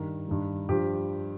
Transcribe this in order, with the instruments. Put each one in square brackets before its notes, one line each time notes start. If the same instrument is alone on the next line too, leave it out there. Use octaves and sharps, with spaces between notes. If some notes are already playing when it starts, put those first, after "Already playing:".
Already playing: [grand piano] G2 D#3 A#4
G2 D#3
G2 F3 G4